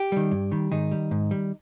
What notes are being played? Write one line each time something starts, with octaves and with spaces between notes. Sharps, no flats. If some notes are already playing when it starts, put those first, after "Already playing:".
Already playing: G4
D#3 G3
G2
D#3 G3
G#2 D#3 D#4
G3
G#2
G3